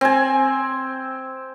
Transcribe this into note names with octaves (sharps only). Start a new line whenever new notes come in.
C4 G#5